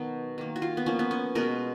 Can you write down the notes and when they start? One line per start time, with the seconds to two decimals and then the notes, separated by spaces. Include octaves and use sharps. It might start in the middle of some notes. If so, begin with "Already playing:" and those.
Already playing: B2 D#3 F#3 B3
0.38 D#3 A#3
0.56 F#4
0.62 F4
0.77 B3
0.86 F3 A#3 C#4
0.99 B3
1.11 C#4
1.35 B2 G#3 B3 A#4